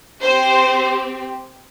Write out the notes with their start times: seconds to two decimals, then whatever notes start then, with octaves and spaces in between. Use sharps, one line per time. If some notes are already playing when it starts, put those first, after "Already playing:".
0.21 C4 G4 C5